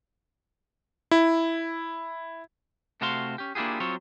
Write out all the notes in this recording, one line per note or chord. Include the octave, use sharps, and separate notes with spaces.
E4
C3 A3 F#4 C5 F5 C6
C#4 G4
A#3 D4 E4 F4 G4 G#4
F#3 C4 F4 C#5